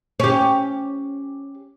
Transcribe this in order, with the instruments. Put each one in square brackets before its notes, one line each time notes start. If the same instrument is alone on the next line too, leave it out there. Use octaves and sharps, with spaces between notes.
[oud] C#4 G4